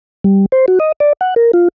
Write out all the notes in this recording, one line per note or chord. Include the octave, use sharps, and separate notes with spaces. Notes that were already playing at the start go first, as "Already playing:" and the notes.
G3
C5
F#4
D#5
D5
F#5
A#4
F4